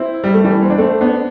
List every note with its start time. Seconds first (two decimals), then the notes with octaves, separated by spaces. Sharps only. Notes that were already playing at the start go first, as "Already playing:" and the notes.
Already playing: C4 E4
0.24 G3
0.34 A3
0.44 E3 G3
0.62 C4
0.70 D4
0.78 A3 C4
1.01 B3 D4